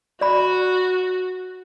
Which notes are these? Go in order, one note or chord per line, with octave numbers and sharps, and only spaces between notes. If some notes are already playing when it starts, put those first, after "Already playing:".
F#4 D5 B5